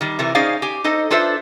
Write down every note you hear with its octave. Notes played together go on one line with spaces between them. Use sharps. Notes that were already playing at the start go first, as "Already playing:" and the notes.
D#3 G3
C3 E3 G3 A#4
C#4 D#4 G#4 C5 D5 F5
G4 G#5
D#4 A4 C5 D#5
D4 F4 A4 B4 C5 E5